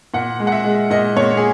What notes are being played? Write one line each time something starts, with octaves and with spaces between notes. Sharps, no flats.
A#2 F#5
G#3
F#5
E5
G#3
A#2 D#5
A#2 C#5
G#4